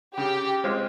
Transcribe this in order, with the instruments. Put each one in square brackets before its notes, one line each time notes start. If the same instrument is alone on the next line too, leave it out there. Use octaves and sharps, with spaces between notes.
[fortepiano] C#3 [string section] G4
[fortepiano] G#3 C4 F4